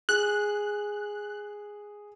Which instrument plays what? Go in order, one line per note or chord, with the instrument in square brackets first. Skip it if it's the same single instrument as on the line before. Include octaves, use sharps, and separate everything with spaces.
[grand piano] G#4 [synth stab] F#6